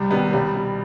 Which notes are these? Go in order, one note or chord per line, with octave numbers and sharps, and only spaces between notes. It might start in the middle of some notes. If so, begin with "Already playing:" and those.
Already playing: C2 G3
C3 D#3 G3 B3
C2 G3
B2